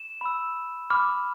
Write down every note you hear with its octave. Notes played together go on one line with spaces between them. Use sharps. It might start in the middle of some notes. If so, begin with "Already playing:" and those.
Already playing: E7
B5 E6
B5 D6 F6